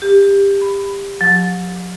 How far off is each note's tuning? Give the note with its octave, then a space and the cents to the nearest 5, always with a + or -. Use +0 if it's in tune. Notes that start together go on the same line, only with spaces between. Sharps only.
G4 +20
B5 +10
F#3 -45